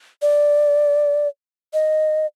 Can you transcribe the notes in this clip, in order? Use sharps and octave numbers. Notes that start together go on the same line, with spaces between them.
D5
D#5